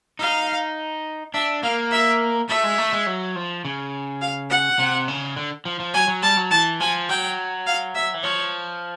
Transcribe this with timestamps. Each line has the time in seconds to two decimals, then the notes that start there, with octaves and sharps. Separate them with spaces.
0.19 D#4 F5
1.34 D4 E5
1.63 A#3 F5
1.91 E5
2.49 A3 E5
2.64 G#3
2.78 A3
2.93 G#3
3.07 F#3
3.36 F3
3.65 C#3
4.21 F5
4.50 F#5
4.79 C3
5.08 C#3
5.36 D3
5.65 F3
5.80 F3
5.94 F#3 G#5
6.08 F#3
6.23 G3 A5
6.37 F#3
6.51 E3 A5
6.80 F3 G#5
7.09 F#3 G5
7.67 F5
7.95 E5
8.14 E3
8.23 F3 C#5